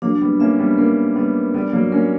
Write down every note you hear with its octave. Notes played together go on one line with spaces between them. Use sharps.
F#3 A#3 D4
G3 B3
A#3 C#4 E5
G3 B3
A#3 C#4 A#4
G3 B3 D4
G3 B3 D5
F#3 A#3
A#3 C#4 A#4